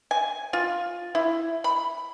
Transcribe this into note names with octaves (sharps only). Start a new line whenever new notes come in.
G#5
F4
E4
B5